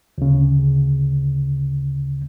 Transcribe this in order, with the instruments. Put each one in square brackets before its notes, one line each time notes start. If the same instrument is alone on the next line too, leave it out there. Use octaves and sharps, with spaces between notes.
[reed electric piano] D2 C#3